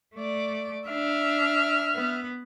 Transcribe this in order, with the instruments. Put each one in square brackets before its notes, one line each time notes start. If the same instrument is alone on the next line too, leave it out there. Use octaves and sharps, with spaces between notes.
[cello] A3 D5
[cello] D4 [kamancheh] E5 F6
[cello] B3